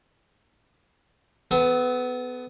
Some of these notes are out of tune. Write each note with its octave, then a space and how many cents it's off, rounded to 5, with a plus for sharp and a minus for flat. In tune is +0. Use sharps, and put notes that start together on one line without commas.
B3 +20 A4 -30